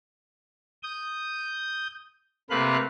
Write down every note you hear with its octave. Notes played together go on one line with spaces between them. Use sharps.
D#6 G6
C3 A3 A#3 B4 F5 F#6